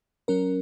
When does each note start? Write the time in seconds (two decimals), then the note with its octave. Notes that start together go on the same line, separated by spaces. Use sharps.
0.28 F#3 C#4 A#4